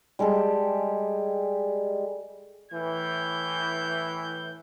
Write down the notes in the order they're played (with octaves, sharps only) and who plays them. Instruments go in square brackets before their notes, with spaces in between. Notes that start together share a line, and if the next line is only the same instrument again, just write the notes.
[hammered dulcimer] G3 G#3 G4 A4
[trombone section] A2 E3 [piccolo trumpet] G6